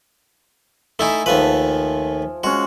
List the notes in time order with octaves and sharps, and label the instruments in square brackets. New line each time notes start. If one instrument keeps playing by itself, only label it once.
[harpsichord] A3 D#4 E4 [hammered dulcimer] E5 G#5
[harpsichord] D#2 A3 B4 [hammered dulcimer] F3
[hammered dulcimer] G#3 C#4 [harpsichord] F#4